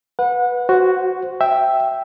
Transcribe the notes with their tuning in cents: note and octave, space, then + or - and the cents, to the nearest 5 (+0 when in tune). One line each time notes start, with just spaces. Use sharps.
B4 -5 F#5 -30
F#4 +5 C5 +0
E5 +0 G5 +0